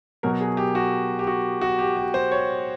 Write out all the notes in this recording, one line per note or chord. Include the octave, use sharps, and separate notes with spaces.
B2 F#3 A#4
G#4
G4
F#4
G4
F#4
F#4
G4
G4
C5
C#5